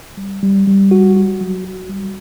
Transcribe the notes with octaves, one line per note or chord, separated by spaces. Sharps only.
G3
G3
G3
F#4
F#4
F#3
F#4
G3